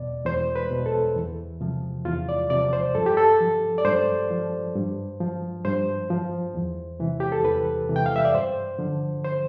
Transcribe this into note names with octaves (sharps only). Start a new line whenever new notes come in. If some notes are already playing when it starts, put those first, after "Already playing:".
Already playing: E2 B2 D5
E2 C5
B4
B2
A4
E2
C3 F3
E2 F4
D5
C3 F3 D5
C5
G2 A4
G4
A4
F3
D5
G2 C5
F3
G2
F3
G2 C5
F3
E2
C3 E3
G4
A4
E2 B4
C3 E3
G5
F5
E5
D5
G2 C5
D3 F3
C5